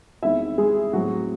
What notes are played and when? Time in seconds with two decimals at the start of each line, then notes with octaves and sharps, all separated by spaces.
0.22 E2 D#3 G#3 C4 E4 E5
0.58 G#3 G#4
0.93 A2 F#3 G#3 C4 F#4